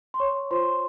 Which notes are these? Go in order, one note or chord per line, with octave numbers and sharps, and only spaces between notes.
C6
C#5 C#6
F4 C5 C6